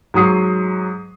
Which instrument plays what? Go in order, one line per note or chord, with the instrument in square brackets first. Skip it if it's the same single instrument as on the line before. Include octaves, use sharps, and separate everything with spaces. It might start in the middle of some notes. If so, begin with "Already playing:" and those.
[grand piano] G#2 F#3 D#6 C7